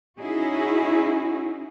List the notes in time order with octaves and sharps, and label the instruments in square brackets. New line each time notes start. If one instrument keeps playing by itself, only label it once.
[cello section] C#4 D#4 E4 F#4 G#4